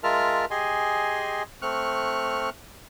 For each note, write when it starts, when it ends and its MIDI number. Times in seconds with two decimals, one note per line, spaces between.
0.04 0.45 56
0.04 0.45 65
0.04 0.45 70
0.04 0.45 76
0.04 0.45 81
0.04 0.45 89
0.51 1.43 67
0.51 1.43 68
0.51 1.43 75
0.51 1.43 80
0.51 1.43 84
1.62 2.50 57
1.62 2.50 60
1.62 2.50 85
1.62 2.50 89
1.62 2.50 90